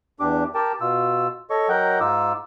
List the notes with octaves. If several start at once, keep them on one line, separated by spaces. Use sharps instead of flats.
E2 D4 G4 D6
G4 A#4 G5 A5
B2 F4 E6
A4 C#5 D#5 C#6
F#3 A#4 D#5 F#5 G5 G6
G#2 D#4 F4 D6 E6